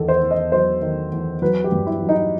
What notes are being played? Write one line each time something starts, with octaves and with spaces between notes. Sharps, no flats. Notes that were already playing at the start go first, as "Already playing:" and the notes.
Already playing: E2 D#3 A4
C5
E2
D#5
F#3 C5
D#3
E2
F#3 B4
G4
G2
E4
F#3
D#4